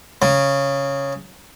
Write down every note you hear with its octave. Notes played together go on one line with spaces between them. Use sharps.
C#3